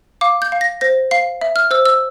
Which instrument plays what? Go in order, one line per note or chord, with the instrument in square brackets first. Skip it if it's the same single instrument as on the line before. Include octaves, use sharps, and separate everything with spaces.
[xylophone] F5 D6
G6
F5
A#6
C5 A#6
F5 C7
E5
F6
C5 E6
E6